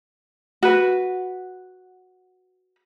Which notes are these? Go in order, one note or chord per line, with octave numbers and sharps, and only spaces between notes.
F#4 B4